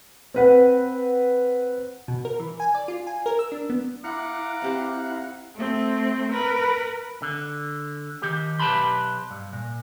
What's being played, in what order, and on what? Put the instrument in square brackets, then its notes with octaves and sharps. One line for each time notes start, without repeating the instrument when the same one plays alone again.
[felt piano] C4 B4 F#5
[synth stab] B2
A#4
E3
G#5
D5
F4
G#5
A#4
E6
D4
B3
[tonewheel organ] E4 F#5 [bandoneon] F5 A#5 F#6 [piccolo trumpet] D6
[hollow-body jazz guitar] C4 G4 C5
[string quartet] A3 C4
A#4 B4 B5 A#6
[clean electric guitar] D3
D#3 G4
B1 G4 B4 A5 B5 C6
G2
A#2